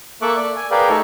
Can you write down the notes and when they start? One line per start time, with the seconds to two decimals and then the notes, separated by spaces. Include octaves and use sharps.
0.22 A#3 A4 E5 C#6 D6 F#6
0.36 D5
0.56 G#5
0.71 G#4 A#4 B4 D5 F5 G5
0.89 A3 D#4 G4 A4 C#6